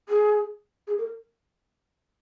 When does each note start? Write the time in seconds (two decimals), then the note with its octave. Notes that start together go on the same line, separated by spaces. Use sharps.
0.09 G#4
0.87 G#4
0.98 A#4